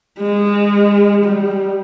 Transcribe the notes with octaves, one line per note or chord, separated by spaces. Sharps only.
G#3
G3